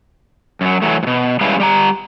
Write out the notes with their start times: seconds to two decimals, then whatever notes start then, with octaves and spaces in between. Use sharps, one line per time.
0.61 F#2 F#3
0.82 E3 F#3 A3
1.03 G#2 B2
1.41 G3 G#3 C#4 E4 B4 F5
1.60 G3 G4 A#5